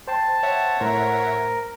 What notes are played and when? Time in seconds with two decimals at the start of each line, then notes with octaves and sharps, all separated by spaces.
0.08 C5 G5 A5 C6
0.43 C#5 E5 F#5
0.81 A2 A#4 C5